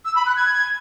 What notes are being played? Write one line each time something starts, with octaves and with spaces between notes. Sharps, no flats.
E6
B5
F#6
G#6